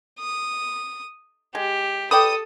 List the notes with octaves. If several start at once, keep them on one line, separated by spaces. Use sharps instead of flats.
D#6
G#3 G4
A4 B4 D5 G5 D#6